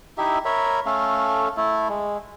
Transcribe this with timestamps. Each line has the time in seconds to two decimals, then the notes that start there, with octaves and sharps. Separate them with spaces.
0.18 D#4 E4 G4 E5
0.45 A#4 C#5 E5 B5
0.86 A3 C#4 A4 F5
1.57 A3 E4 A4
1.89 G#3